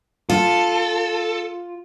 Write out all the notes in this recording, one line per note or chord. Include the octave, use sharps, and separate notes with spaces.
F4 A4